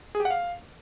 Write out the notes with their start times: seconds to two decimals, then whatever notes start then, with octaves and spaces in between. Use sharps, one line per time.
0.15 G#4
0.20 G4
0.25 F#5
0.30 F5